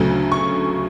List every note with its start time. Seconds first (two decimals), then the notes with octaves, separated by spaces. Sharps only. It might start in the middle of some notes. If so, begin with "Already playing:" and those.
Already playing: D2 C#3 F#3 A3
0.32 C#6